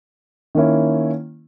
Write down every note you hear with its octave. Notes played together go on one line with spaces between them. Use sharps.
D#3 A#3 C#4 E4